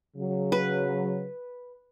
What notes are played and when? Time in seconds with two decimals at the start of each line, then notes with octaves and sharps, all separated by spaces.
0.17 C#3 F#3
0.52 B4